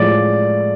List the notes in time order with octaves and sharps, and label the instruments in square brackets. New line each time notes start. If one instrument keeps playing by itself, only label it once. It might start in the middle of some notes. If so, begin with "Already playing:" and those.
Already playing: [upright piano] A2 F3 G#3 D5